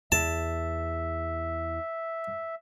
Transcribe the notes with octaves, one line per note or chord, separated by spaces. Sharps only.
E2 E5 A5